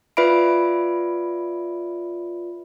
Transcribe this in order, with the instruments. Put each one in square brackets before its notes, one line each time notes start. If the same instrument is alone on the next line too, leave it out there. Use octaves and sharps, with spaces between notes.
[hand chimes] F4 B4 D5 E5 B5 D7